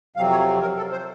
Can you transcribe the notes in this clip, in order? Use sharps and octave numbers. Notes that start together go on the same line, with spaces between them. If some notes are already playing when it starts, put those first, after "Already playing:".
F2 C3 F#3 C4 F5
C#5
A#4
A4
C5